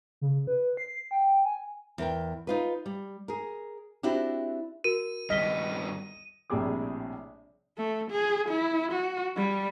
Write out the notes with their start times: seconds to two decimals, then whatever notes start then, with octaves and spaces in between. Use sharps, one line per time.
0.21 C#3
0.47 B4
0.77 C7
1.11 G5
1.45 G#5
1.98 E2 A#4 G5
2.47 D#4 F4 B4
2.86 G3
3.28 G#4 A#4
4.03 C4 D4 E4 F#4 G4
4.84 F#4 A#4 D#7
5.30 G2 D#3 D#5 F6 B6 G7
6.50 A#1 A2 C3 G3 G#4 D6
7.78 A3
8.11 G#4
8.49 E4
8.92 F#4
9.37 G3